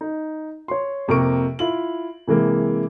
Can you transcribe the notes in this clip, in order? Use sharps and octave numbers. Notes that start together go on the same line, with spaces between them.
D#4
C#5 C6
F2 C3 A#3 A#4 C#6 D7
E4 F4 F#7
C3 E3 G#3 A#3